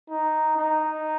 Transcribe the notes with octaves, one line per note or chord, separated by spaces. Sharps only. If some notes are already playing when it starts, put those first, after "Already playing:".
D#4
D#4